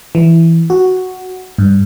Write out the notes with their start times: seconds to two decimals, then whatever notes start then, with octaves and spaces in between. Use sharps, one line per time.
0.15 E3
0.70 F#4
1.58 G2